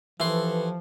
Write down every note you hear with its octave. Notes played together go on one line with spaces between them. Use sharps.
E3 F3 G4 A4 B4 C6